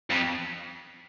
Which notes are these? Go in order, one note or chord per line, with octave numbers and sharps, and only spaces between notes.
F2